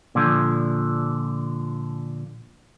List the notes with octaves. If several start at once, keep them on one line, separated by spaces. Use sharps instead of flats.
A#2 D3 F3